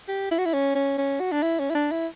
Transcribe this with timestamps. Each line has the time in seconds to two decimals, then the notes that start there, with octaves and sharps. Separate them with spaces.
0.08 G4
0.31 E4
0.38 F#4
0.46 E4
0.53 C#4
0.75 C#4
0.98 C#4
1.20 F#4
1.32 D4
1.43 E4
1.59 C#4
1.70 E4
1.75 D4
1.91 E4